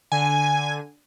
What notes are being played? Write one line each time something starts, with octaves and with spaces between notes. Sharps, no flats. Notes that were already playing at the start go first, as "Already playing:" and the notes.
D3 G#5